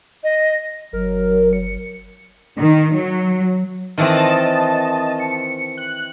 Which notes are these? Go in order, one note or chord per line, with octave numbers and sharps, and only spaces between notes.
D#5
G1 F#3 A#4
C#7
D#3
F#3
D#3 E3 C4 D#5 A5
C#7
F#6